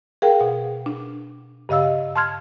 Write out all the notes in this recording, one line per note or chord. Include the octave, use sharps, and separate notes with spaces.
G#4 A#4 F5 G5
B2 F#5
D4
G2 C#3 D#5 F5 E6
A5 C6 F6 G#6